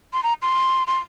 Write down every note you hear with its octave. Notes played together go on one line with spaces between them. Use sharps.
C6
A#5
C6
C6